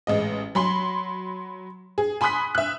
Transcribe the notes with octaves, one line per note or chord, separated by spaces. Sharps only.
A1 G#3 D#5
F#3 B5 C6
G#4
G#5 B5 C6 D#6 F#6 B6
E5 F#6